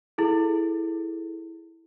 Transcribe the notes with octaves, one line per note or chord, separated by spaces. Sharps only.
E4 G#4 A4